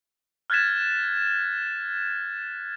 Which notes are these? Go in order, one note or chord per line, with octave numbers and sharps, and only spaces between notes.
F6 F#6 G#6 A6 B6 E7